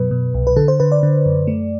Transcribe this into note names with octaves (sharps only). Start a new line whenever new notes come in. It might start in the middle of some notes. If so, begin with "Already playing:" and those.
Already playing: F#2 B2 F#3 B4
B2
C2
B4
D3 A4
C5
D3 B4
D5
D3
F#2
A3